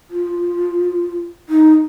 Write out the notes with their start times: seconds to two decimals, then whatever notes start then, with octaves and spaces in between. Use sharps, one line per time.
0.10 F4
1.49 D#4